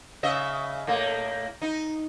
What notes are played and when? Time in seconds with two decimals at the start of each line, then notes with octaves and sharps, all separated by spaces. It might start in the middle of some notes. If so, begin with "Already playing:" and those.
0.23 C#3 D#5 E5
0.87 A2 A#3
1.62 D#4